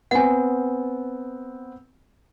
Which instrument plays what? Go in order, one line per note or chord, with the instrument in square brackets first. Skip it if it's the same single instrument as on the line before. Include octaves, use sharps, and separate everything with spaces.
[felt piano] B3 C4 [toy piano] F#5 G#5